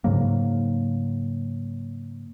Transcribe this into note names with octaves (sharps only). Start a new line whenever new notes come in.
G#2 C#3 F#3 A#3